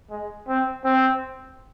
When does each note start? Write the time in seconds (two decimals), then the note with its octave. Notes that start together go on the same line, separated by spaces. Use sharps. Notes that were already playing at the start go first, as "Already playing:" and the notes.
0.11 G#3
0.48 C4
0.84 C4